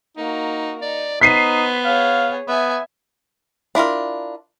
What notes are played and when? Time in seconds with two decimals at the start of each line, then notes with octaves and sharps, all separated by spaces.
0.17 A#3 D#4 F#4
0.82 D#4 D5
1.21 B3 D#4 C5 B6 C7 D#7
1.85 G#4 C#5 F5
2.48 B3 E5 G#5
3.75 D4 E4 F4 A#4